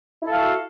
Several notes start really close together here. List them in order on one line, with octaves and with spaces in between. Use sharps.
E4 A4 F5 F#4